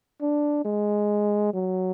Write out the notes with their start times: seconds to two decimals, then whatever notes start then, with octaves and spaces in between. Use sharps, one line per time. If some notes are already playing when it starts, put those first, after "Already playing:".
0.22 D4
0.65 G#3
1.54 F#3